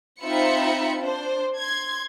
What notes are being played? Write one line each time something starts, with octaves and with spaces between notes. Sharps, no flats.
C4 D#4 F4 E5 B5 C#7
D4 C5
C6 G#6